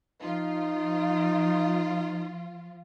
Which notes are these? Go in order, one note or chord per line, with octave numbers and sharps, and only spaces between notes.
F3 D#4 F4